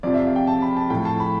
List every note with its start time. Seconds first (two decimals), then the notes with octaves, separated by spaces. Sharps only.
0.03 F2 C3 F3 D5
0.14 E5
0.25 F5
0.36 G5
0.47 A5
0.62 B5
0.77 A5
0.90 A2 F3 G5
1.05 A5
1.20 B5